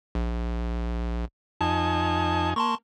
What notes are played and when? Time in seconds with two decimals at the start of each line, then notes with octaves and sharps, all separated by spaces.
0.15 A#1
1.61 F2 D#4 G#5 A5
2.56 A#3 A5 C6 C#6